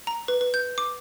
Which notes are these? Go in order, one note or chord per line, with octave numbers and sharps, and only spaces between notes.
A#5
B4
B4
G6
D6